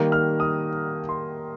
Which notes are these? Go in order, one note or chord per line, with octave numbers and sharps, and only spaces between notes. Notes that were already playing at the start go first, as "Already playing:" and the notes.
Already playing: D#3 G3 A#3
F6
D#6
C6